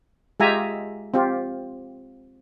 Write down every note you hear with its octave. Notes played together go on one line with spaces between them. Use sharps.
G#3 F4 G4 E5 G#5 A#5
C4 F4 G4